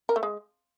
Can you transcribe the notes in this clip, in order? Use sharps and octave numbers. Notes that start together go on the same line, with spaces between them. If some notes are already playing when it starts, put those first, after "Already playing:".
A#4
A3
G#3